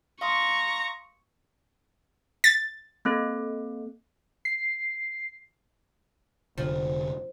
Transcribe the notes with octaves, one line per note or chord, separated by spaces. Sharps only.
F5 A#5 C6 C#6 D#6
A6
A#3 C4 A4
C7
F1 D3 F3